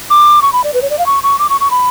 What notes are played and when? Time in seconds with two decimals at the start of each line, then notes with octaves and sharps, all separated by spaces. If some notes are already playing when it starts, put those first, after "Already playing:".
0.10 D6
0.42 C#6
0.53 B5
0.64 D5
0.74 B4
0.82 C#5
0.90 D5
0.99 F5
1.06 C#6
1.23 C#6
1.39 D6
1.49 C#6
1.60 C#6
1.71 B5